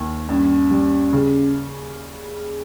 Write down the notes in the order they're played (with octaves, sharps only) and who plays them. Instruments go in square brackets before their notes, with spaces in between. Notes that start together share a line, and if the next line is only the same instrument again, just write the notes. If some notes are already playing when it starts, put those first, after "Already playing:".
Already playing: [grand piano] D#2 D#3
[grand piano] G2 [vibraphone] C#4
[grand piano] G3
C#3